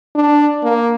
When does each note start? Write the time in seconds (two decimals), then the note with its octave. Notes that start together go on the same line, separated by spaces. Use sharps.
0.15 D4
0.63 A#3